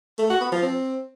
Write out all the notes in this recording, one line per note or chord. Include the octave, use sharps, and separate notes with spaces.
A3
F#4
B3
F3
C4